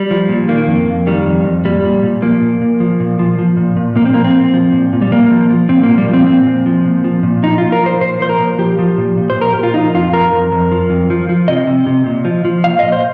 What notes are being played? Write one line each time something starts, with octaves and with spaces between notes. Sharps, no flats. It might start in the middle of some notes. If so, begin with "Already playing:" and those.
Already playing: G3
F3
A#2
D#3 A#3
F2
F2
D#3 G3
F2
F2
A#2 G3
A#2
A#2
F3 A#3
A#2
A#2
F3
A#2
F3
F3
A#2
A#2
A#2 A#3
C4
F3 A#3
C4
A#2
F3
A#2
A#2
G3
A#2 A#3
F3
F3
A#2 C4
A#3
A#2
G3
F3
C4
A#2 C4
A#2
F3
A#2
F3
A#2
F3 D#4
A#2 F4
A#4
F3 C5
A#2 C5
F3 C5
A#4
A#2
F3 G4
F3
A#2
A#2
C5
A#2
A#4
A#2 G4
F4
F3 D#4
F2 F4
F3 A#4
F2
F2
F3
F2
F3
F3
C3 D#5
C3
C3
A#2
F3
F3
A#2 F5
A#2 D#5
C5